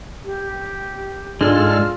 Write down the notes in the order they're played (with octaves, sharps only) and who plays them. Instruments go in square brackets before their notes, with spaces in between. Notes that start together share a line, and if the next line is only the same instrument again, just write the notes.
[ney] G4
[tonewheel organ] G#2 A4 F6 [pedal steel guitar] G#3 [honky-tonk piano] D4 [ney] F4